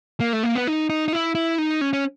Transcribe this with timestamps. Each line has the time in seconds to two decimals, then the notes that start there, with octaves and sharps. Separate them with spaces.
0.20 A#3
0.33 A3
0.43 A#3
0.55 B3
0.67 D#4
0.90 D#4
1.08 D#4
1.13 E4
1.35 E4
1.58 D#4
1.81 C#4
1.93 C#4